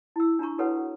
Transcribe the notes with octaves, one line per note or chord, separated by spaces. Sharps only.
E4 E6
D4 F4 A#5 C#6
E4 F#4 A4 B4 C#5 F#5